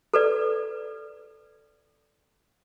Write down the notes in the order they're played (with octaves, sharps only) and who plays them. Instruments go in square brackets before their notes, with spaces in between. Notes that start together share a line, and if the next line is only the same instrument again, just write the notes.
[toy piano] A4 B4 D5